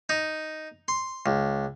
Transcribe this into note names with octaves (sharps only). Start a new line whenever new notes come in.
D#4
C6
C#2